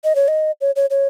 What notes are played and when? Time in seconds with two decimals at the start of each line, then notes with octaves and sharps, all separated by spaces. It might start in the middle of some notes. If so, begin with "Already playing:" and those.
0.04 D#5
0.15 C#5
0.28 D#5
0.61 C#5
0.76 C#5
0.90 C#5